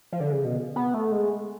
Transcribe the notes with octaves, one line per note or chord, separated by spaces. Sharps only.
F3
D3
C#3
B2
B3
A3
G#3